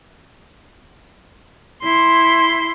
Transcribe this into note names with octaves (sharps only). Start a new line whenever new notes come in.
E4 C6